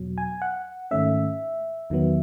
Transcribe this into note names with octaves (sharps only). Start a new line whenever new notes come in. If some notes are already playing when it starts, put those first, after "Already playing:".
Already playing: E2 B2 F#3
G#5
F#5
G#2 D#3 A3 C#4 E5
E2 D#3 F#3 B3